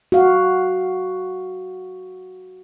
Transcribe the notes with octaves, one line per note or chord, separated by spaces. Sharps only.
F#4 F5